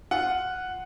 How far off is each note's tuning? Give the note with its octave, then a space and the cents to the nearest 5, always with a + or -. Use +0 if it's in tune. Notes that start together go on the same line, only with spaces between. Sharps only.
F4 +0 F#5 +0